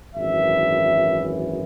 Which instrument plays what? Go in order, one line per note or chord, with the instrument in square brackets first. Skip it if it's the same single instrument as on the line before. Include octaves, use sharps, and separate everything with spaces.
[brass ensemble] G#1 F#2 E3 E5